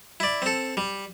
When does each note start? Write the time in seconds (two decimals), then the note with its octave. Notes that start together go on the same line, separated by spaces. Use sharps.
0.20 E4 D5
0.42 C4 A4
0.77 G3